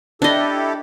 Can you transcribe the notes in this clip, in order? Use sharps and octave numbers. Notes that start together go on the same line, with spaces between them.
D4 E4 G4 A4 D#5